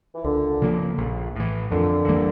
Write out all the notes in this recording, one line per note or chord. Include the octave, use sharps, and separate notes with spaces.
E3
C#2 A#2 D3
C#3 F3 A#3
A#1
A2 E3
F2 A#2 D3
E3 G3 A#3